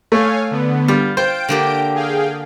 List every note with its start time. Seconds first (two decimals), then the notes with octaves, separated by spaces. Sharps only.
0.12 A3 C#5 F5 G#5
0.51 D3 B3
0.88 G3 F4
1.17 F4 C5 G5 G6 D7
1.49 D3 A#3 G4
1.95 G#4 F5 G5